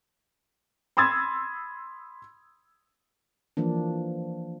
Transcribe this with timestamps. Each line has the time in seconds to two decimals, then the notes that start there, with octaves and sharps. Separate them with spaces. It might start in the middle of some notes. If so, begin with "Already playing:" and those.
0.97 B5 C6 D#6 E6 G#6 A6
3.57 E3 F3 A#3 D4